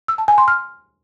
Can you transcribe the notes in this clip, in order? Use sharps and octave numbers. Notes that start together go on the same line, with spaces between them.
E6
A5
G#5
C6
F6